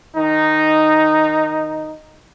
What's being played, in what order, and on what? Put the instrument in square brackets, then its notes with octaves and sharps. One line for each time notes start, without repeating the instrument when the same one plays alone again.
[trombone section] D#3 D#4